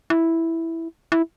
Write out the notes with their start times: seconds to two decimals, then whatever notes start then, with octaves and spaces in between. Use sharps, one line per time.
0.10 E4
1.12 E4